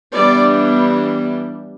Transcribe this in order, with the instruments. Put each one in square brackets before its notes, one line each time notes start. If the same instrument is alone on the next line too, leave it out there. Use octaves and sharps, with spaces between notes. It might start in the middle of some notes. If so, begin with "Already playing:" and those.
[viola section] E3 G3 B3 D4 D5